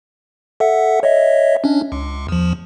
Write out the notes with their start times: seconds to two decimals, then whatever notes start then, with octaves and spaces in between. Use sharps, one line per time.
0.60 A4 E5 F#5
1.03 C#5 D#5 E5
1.64 C#4 D4
1.92 C#2
2.29 E2 F3